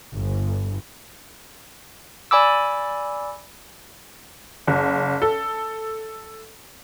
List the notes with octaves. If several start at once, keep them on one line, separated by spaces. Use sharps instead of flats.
G1
D5 G#5 B5 D6 E6
F#1
A4